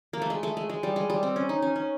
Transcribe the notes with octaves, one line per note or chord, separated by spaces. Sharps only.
A#3
A3
G#3
A3
G#3
G#3
G3
G#3
G3
C4
C#4
D#4
C#4
C#4